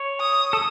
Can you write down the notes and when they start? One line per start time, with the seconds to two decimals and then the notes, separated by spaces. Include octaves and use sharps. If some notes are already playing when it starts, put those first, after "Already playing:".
Already playing: C#5
0.21 D#6
0.53 A4